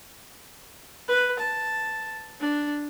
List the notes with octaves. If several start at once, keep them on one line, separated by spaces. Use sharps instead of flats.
B4
A5
D4